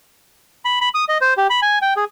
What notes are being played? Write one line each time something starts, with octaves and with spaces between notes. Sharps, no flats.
B5
B5
D#6
D#5
C5
G4
B5
G#5
G5
G#4